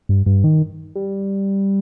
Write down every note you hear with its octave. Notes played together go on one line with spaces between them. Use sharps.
G2
G2
D#3
G3